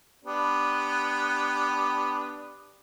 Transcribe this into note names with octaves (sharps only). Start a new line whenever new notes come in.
B3 D4 G4